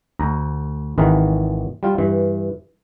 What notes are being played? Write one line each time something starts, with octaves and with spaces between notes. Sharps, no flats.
D2 A#5
G#1 D#3 E3 G#4 A#4 B4
G3 F4
G2 E3